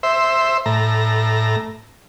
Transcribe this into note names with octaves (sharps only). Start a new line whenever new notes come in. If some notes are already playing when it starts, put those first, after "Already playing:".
C5 E5
A2 A#5